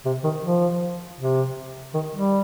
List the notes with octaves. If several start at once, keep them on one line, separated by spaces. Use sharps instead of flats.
C3
D#3
F3
C3
D#3
G3